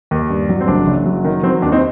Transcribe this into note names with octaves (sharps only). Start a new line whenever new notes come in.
D#2
G2
F#3
C4
F#1 D4
F#1
F#3
D#3
F#3 C4
D#2 D4
C4 D#4